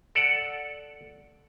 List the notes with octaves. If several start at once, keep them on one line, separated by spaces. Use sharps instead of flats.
A4 D5 F#5